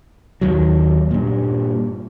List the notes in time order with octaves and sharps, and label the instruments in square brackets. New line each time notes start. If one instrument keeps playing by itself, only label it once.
[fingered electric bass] D#2 D#3 F#3
G2 A#2